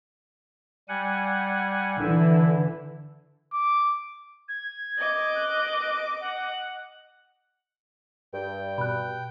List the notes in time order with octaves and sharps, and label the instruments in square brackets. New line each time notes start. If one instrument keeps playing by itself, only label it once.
[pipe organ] G3 F#5 G#5
[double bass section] D3 E3 [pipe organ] E4
[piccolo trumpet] D6
[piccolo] G#6
[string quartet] D#5 D6
[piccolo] F#6
F#5
[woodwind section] G2 [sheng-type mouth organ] G5
[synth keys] B2 [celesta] B5 F#6